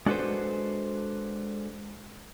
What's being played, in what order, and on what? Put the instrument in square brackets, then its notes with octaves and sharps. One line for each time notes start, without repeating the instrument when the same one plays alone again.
[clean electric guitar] G#3 D4 F#4 A4 B4 C5